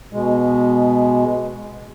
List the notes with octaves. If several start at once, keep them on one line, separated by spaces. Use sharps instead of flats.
B2 G#3